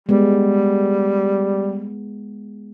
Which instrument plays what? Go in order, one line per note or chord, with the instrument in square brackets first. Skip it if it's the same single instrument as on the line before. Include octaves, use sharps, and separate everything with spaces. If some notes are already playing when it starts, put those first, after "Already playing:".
[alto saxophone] G3 [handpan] G#3 B3